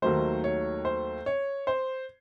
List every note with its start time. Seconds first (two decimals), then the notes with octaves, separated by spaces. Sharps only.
0.02 D#2 D#3 F#3 A3 C5
0.44 C#5
0.85 C5
1.26 C#5
1.67 C5